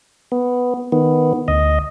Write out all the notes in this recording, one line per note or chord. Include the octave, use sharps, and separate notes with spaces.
B3
D#3 B3
D2 D#5